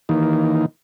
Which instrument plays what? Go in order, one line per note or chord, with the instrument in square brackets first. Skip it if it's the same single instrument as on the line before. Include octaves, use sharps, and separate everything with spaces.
[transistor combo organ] D#3 E3 A#3 D#4